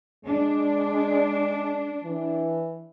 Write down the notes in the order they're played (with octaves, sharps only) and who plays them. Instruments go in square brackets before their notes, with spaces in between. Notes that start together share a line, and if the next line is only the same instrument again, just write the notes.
[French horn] G#3 [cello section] D4
[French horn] E3